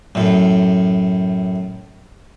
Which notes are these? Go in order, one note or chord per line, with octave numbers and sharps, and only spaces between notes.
F#2 A2